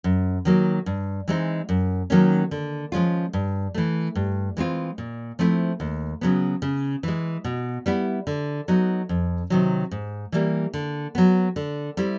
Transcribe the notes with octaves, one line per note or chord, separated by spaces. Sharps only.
F#2
D#3 F#3 A#3
G2
E3 G#3 C4 D#4
F#2
D#3 F#3 A#3 C#4
D3
F3 G#3 C#4 F4
G2
E3 A3
G2
E3 G#3 C4 F4
A#2
F3 A3 C4 E4
D#2
C#3 F#3 B3
C#3
E3 G#3
B2
G3 B3 E4
D3
F#3 B3 D#4
F2
C3 D#3 F#3
G#2
E3 G3 A#3
D3
F#3 B3
D3
G3 C4 E4